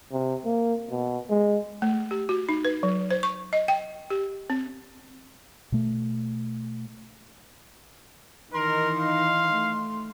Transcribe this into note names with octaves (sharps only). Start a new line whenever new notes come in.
C3
A#3
B2
G#3
A3
G4
F#4
D#4
B4
F#3
C5
C#6
D#5
G5
G4
C4
B2 A3
D#3 E3 D#4 A#4 C6
F5
A3